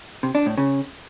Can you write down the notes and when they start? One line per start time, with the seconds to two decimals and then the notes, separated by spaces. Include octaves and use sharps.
0.23 C3
0.35 D4
0.46 A2
0.57 C#3